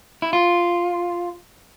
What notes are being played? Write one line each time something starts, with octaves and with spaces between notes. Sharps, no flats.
E4
F4